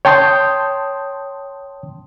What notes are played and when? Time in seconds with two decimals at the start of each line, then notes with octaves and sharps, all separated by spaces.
0.05 C#5 G5 A5 C6 D#6 G6